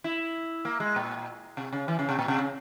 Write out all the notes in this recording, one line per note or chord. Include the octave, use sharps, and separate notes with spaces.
E4
A#3
G#3
A#2
C3
C#3
E3
C#3
C3
A#2
C3
C#3